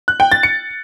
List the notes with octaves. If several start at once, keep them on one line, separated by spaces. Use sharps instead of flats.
F#6
G5
A6
C#7